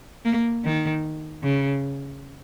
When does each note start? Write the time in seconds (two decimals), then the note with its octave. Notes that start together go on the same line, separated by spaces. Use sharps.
0.25 A#3
0.65 D#3
1.43 C#3